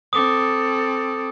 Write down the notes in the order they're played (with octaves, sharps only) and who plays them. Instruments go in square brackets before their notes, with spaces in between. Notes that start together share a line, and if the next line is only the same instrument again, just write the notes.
[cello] C4 A4 [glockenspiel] D6 D#6